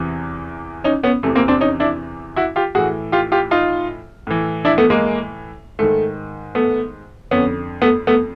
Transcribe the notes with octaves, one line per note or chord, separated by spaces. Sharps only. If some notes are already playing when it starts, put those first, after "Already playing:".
Already playing: E2 C3 E3
C#4 D#4
B3 C#4
E2 C3 E3 A3
A#3 C4
C4 D4
C#4 D#4
D4 E4
E4 F#4
F4 G4
A2 E3 F#4 G#4
F4 G4
F4 G4
D#4 F4
A2 E3
D4 E4
A3 B3
G#3 A#3
G#2 D#3 A3
A3 B3
F2 D3 B3 C#4
A3 B3
A3 B3